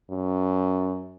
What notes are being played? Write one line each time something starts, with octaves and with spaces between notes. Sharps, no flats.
F#2